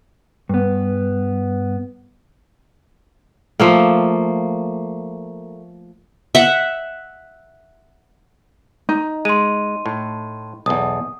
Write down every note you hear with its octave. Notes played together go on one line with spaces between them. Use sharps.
G2 B3
F3 A3 A#3
E5 F#5
D#4
G#3 C6 D#7
A2
B1 E2 D#6